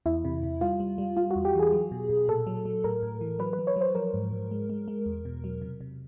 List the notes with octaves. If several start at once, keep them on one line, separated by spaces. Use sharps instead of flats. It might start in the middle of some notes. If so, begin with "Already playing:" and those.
E2 E4
C3
C3
G3 F4
G3
G3
G3 F4
E2 F#4
G4
E3 G#4
F#3
B2
B2
A#2 A4
F#3
F#3
A2 A#4
A2
E3
F#3 B4
B4
F#3
C#5
F#3 C5
F3 A#4
G#2
G#2
G#3
G#3
G#3
E2
B2
F#3
C3
C3